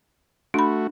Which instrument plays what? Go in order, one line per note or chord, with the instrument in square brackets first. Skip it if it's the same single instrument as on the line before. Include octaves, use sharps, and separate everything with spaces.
[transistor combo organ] A3 F#4 [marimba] D4 B5